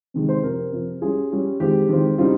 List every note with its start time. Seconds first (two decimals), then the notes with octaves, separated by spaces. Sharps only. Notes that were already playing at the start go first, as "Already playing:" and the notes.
0.14 C3 D#3 G#3 D#4
0.29 C5
0.43 C3 F3 C4 A#4
0.72 C3 F3 C4
1.02 G3 C#4 F4 G#4
1.32 G3 C#4 F4
1.60 D#3 G#3 C4 F4 G4
1.89 D#3 G#3 C4 F4
2.18 C#3 G3 C4 D#4 F4